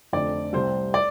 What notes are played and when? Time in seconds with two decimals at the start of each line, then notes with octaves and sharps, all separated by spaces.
0.13 F1 F2 D3 D5
0.53 C2 C3 G3 C5
0.94 D5